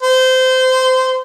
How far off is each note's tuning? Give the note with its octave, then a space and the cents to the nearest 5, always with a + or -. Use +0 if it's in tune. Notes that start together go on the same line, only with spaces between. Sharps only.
C5 -20